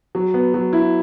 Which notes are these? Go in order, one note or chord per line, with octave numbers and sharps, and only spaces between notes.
F#3
B3
F#3
E4